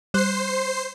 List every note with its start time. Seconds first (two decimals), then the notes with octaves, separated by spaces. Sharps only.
0.14 G3 C5 F#6 C7